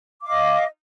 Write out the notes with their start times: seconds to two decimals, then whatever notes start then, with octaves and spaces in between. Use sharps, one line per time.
0.22 D6
0.25 F5
0.27 D#5